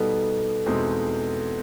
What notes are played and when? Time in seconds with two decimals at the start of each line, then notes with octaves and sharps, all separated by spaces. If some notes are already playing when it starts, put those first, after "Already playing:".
Already playing: B2 G3 B3 D#4 A4
0.66 E2 B2 G#3 C4 D#4